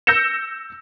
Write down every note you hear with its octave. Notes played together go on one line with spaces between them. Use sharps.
E6 G6 A#6 C#7 E7